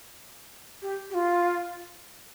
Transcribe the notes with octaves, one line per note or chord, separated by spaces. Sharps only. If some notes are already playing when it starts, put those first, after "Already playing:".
G4
G4
F4